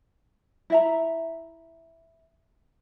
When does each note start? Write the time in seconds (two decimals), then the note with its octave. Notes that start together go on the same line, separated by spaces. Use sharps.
0.70 E4 E5 A#5